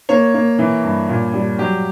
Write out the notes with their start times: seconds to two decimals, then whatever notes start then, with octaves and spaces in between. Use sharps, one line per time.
0.09 A#3 C#5
0.34 A#3
0.59 E3
0.84 G2
1.09 A#2
1.34 G3
1.58 F#3 G4